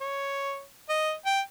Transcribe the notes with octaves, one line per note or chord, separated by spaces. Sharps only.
C#5
D#5
G5